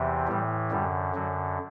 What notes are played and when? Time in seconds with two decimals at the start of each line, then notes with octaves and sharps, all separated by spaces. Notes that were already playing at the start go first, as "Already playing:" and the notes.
Already playing: E2 C3 E3
0.28 A2 E3 G3
0.71 F#2 D3 G3
1.15 F#2 D3 F#3